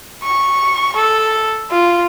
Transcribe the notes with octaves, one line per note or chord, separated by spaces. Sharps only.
C#6
A4
F4